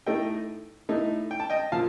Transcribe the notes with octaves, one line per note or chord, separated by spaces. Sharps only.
A2 A3 D#4 D#5 G5
A2 A3 D#4
G5
A5
D#5 G5
A#2 F3 F5 A5